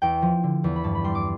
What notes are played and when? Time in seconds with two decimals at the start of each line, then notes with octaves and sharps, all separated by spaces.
0.02 E2 G5
0.22 F3
0.43 D3
0.64 E2
0.76 B5
0.84 G2 A5
0.95 B5
1.04 G3 C6
1.15 D6